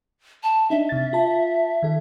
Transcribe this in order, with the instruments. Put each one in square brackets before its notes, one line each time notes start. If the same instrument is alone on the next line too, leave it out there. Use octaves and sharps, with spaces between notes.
[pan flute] A5
[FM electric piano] D4 D#4 [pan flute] E5
[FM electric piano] C3 A6
F4 A5
D#3 A4